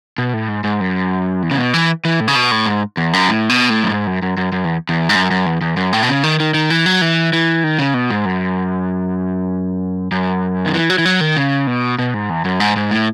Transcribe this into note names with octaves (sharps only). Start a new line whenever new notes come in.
B2
A2
G#2
G#2
F#2
E2
C#3
B2
E3
E3
A2
C#3
B2
A2
G#2
E2
F#2
A2
B2
A2
F#2
G#2
F#2
F#2
F#2
F#2
E2
E2
G#2
F#2
F#2
E2
E2
F#2
A2
B2
C#3
D#3
D#3
D#3
E3
F#3
E3
E3
D#3
C#3
B2
G#2
F#2
F#2
D#3
E3
F#3
E3
F#3
D#3
C#3
B2
B2
G#2
E2
F#2
G#2
G#2
A2